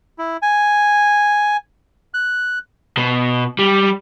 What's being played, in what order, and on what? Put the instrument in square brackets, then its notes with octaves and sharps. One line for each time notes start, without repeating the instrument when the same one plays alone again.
[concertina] E4
G#5
F#6
[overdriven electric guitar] B2
G3